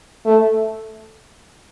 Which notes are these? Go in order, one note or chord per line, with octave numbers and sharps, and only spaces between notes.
A3